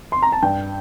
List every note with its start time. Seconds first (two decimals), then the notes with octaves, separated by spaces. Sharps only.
0.12 C6
0.22 A#5
0.32 A5
0.42 G2 G5